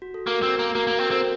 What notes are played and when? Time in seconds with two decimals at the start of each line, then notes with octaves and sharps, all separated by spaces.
0.02 F#4
0.14 A4
0.27 A#3 F#4 A#4
0.43 C4
0.59 A#3
0.75 A#3 F#4 A#4
0.87 A#3
0.99 C4 F#4 A#4
1.11 C4 A4 C5